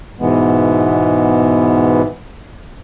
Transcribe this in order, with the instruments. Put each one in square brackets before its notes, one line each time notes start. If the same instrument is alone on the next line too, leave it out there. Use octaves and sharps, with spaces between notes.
[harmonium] G#2 B2 E3 G#3 B3